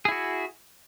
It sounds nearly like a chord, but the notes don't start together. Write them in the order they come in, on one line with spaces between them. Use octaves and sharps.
G#4 E4 F#4